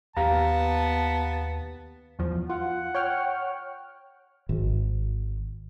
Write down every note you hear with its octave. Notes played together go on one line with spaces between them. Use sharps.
D#2 B3 G4 F5 A5 A#5
E2 F3
F4 F#5
C#5 G5 F6
G#1